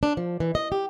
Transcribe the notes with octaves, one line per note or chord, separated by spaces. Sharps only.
D4
F3
E3
D#5
G4